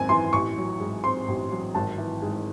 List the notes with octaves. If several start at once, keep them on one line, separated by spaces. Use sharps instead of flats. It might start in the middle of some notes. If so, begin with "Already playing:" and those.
Already playing: G#1 F#2 C4 G#5
E3 C6
A1 C#6
F#3
G#2
C4 C6
A1
F#3
G#1 A5
E3
G#2